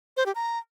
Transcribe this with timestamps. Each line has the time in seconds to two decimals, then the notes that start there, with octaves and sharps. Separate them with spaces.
0.17 C5
0.26 G4
0.35 A#5